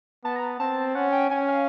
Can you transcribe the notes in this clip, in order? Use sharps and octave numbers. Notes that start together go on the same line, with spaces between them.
B3 A5
A#5
C4 A5
C#4 F#5
G5
C#4 G#5
F5